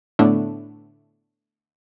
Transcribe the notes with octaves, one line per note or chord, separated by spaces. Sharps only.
A2 D3 A3 B3 D4